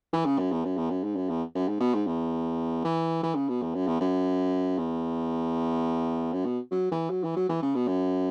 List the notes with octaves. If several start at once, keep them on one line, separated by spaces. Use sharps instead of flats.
E3
C#3
F#2
E2
F#2
E2
F#2
G#2
F#2
E2
F#2
G#2
B2
G#2
E2
E3
E3
C#3
B2
E2
F#2
E2
F#2
E2
F#2
B2
F#3
E3
F#3
E3
F#3
E3
C#3
B2
F#2